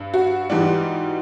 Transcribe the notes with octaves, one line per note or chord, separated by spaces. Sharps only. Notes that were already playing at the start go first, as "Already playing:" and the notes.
Already playing: G2
F#4
G#2 E3 G3